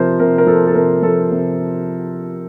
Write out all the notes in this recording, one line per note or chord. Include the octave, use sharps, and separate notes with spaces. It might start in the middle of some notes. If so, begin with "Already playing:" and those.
Already playing: C3 F3 A#4 C5
C3 A#4
A#4
F3 A4
A4
C3 A#4
F3 A4
C3